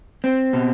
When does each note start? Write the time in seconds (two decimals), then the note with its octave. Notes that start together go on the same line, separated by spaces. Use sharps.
0.24 C4
0.53 B2